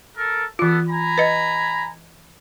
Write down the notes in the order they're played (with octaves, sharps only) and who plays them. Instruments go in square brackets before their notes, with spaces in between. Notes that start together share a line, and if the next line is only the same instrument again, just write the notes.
[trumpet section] A4 A#4
[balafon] E3 F4 [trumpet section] B3 A4
[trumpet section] G#5 A#5 B5
[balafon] B4 D#5